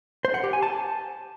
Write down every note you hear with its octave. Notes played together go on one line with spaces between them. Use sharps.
C5
F#5
G4
G#5
A5